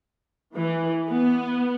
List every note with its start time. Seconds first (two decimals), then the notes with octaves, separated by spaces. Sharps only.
0.55 E3
1.08 B3